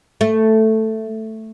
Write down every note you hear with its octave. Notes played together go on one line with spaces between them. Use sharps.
A3